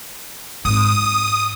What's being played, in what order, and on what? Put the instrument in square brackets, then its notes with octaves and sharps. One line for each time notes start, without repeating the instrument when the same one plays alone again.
[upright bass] G#2 C4 [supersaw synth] D#6